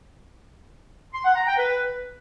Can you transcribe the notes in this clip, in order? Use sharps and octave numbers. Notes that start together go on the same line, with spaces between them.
C6
F#5
A#5
G5
B4